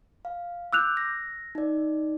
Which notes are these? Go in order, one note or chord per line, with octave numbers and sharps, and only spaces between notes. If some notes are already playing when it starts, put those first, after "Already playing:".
F5
D6 E6 F#6 G6 F7
A#6
D#4 D5